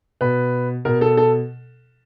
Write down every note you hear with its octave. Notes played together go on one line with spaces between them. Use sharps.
B2 B4
B2 A#4
A4
A4